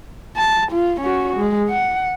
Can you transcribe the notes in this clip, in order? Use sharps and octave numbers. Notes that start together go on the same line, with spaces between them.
A5
F4
C#4 F#4
G#3
F#5